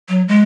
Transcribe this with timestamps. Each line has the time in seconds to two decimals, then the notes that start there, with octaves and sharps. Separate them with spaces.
0.09 F#3
0.28 G#3